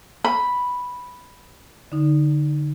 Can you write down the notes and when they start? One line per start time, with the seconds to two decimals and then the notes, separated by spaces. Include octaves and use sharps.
0.24 B5
1.92 D3 D#4